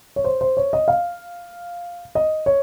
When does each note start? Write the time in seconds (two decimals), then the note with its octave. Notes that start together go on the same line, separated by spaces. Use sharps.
0.16 C#5
0.24 C5
0.41 C5
0.57 C#5
0.73 D#5
0.88 F5
2.15 D#5
2.46 C#5